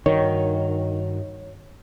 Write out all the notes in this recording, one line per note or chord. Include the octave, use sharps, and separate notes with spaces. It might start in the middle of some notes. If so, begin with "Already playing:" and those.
G2 D#3 D#4 F#4 C#5